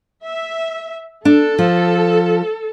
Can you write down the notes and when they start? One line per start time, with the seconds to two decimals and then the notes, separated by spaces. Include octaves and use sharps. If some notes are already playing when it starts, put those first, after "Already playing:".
0.24 E5
1.25 D4 A4
1.58 F3